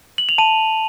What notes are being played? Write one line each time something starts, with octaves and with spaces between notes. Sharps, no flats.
F#7
F7
A5 D#7